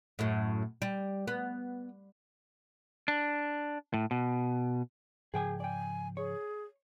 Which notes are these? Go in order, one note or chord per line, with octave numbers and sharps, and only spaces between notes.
F#2 A2
G3
B3
D4
A2
B2
G#2 C#3 F3 G#4 G5 G#5
D5 G5 G#5
G#4 C#5